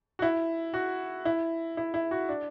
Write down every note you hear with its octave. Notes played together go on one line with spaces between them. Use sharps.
F#4
E4
F#4
E4
E4
E4
F#4
D4